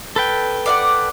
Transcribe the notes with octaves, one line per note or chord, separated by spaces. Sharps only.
A4 B4 G5
D5 F5 F#5